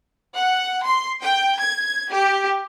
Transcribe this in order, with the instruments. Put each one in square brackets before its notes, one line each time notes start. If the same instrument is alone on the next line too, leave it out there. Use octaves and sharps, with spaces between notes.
[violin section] F#5
C6
G5
G#6
G4